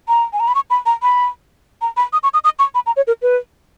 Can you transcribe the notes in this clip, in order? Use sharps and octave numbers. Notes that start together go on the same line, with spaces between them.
A#5
G#5
A#5
B5
C#6
B5
A#5
B5
A#5
B5
D#6
C#6
D#6
D#6
C#6
B5
A#5
C#5
A#4
B4